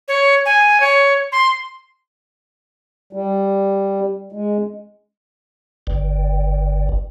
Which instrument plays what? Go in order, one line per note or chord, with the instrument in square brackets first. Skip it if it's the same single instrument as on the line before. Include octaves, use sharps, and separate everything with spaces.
[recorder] C#5
G#5
C#5
C6
[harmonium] G3
G#3
[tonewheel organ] G1